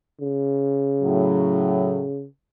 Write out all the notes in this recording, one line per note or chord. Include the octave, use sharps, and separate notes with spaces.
C#3
A2 F#3